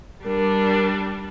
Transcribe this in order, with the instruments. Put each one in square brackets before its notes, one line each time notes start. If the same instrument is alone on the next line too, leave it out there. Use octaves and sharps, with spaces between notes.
[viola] G3 D4 [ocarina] A#4